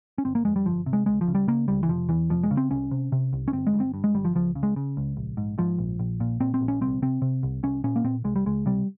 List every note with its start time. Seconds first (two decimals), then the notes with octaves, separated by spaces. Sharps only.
0.18 C#4
0.24 G1 C4
0.35 A#3
0.45 F2 G#3
0.56 G3
0.65 G1 F3
0.86 C3
0.93 G#3
1.06 C#2 G#3
1.21 F3
1.28 C#3
1.35 G3
1.48 C#3 A#3
1.68 C#2 G3
1.83 E3
1.89 F1 F3
2.09 E2 E3
2.30 F1 F3
2.43 G#3
2.51 C#3
2.57 C4
2.70 C2 C#4
2.91 C3
3.12 C3
3.33 C2
3.48 C#4
3.53 G1 C4
3.67 G#3
3.74 G2
3.80 C4
3.94 G2
4.04 G#3
4.15 G1 G3
4.25 F3
4.35 C#2 F3
4.55 C#3
4.63 G#3
4.76 C#3
4.97 C#2
5.17 A#1
5.37 G#2
5.58 G#2 F3
5.79 A#1
5.99 A#1
6.20 A#2
6.40 A#2 C4
6.54 C4
6.61 A#1
6.68 C#4
6.81 C2 C4
7.02 C3 C4
7.22 C3
7.43 C2
7.63 C2 C#4
7.84 A#2 C#4
7.96 A#3
8.04 A#2 C4
8.24 C2 G#3
8.36 G3
8.46 C#2 G#3
8.66 C3 G3